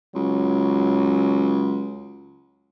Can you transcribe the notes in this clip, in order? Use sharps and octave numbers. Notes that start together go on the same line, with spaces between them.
C#2 F#3